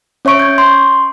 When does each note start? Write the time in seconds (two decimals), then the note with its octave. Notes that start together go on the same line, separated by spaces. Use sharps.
0.25 C#4 C#5 E5 C#6 D7
0.39 G6 G#6
0.58 C6